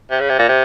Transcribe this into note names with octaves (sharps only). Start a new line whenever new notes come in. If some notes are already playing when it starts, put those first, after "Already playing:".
C3
C#3
C3
A#2
C3